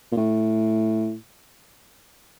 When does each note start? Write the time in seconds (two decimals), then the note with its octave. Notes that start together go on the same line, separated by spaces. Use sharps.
0.12 A#2
0.17 A2